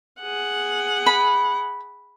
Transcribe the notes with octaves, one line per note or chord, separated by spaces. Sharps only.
G#4 F#5
B5